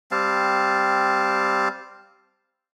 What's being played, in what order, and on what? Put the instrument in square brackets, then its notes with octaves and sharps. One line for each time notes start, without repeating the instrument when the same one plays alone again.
[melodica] G3 C4 F5 A5